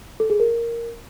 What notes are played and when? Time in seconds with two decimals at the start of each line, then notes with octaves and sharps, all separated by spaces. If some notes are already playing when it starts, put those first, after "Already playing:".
0.20 A4
0.30 G#4
0.40 A#4